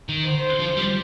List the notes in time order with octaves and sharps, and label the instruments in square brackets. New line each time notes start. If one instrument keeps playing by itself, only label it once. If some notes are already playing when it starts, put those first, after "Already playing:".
[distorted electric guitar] D#3
[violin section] C5
[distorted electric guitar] F3
G3